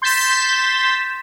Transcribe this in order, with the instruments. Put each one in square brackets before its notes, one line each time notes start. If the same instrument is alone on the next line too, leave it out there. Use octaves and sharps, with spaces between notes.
[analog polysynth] C6 G6 A6 B6 E7